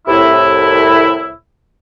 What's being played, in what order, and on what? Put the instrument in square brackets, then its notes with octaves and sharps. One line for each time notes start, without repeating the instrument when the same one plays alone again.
[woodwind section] C2 A2 E4